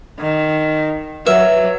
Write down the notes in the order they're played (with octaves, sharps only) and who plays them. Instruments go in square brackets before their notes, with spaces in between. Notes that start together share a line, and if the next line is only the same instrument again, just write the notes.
[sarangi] D#3
[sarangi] F#3 [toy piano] B4 [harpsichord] E5